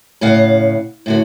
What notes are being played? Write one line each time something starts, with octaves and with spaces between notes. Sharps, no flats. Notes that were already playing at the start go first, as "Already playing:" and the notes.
A2 C#3 F5 F#5
A2 D3 F#4